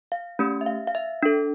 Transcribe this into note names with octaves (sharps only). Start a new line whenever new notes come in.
F5
A3 C#4 G4
E5
F5
F5
E5
D4 A4